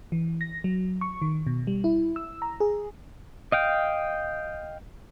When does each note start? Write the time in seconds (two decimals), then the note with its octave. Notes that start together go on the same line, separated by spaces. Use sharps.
0.12 E3
0.41 A#6
0.64 F#3
1.01 C#6
1.22 D#3
1.47 B2
1.67 G3
1.84 E4
2.16 E6
2.42 A#5
2.60 G#4
3.52 D#5 F5 G5